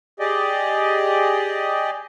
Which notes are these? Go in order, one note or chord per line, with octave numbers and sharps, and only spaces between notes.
G4 G#4 D5 D#5